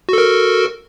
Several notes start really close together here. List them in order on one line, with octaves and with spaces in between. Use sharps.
F#4 A4 A#4